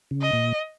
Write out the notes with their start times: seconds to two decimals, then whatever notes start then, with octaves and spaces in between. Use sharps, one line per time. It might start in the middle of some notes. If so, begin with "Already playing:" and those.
0.11 C#3
0.22 D#5
0.33 A#2